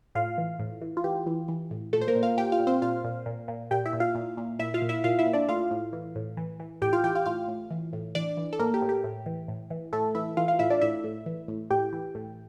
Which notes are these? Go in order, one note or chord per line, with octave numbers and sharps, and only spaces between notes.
A2 F4 F5
E3
A2
E3
F4
E3 G4
E3
E3
A2
A#2 A3 A4
C5
A#3 A#4
A#2
F4 F5
A#2 G4 G5
F4 F5
A#2
C4 C5
A#2 F4 F5
A#2
A#2
A#2
A#2 G4 G5
E4 E5
A#2
F4 F5
A#2
A#2
A#2 E4 E5
F4 F5
A#2
E4 E5
A#2 F4 F5
E4 E5
A#2
D4 D5
A2 F4 F5
A2
E3
A2
E3
E3
A2 G4 G5
F4 F5
E3 G4 G5
F4 F5
A2 F4 F5
A2
E3
A2
E3 D4 D5
E3
A4
A2 A#3 A#4
G4
A2
G4
A2
E3
A2
E3
A2 A3 A4
E3 E4 E5
E3 F4 F5
F4 F5
A2 E4 E5
D4 D5
A2 E4 E5
A2
E3
A2
A2 G4 G5
E3
A2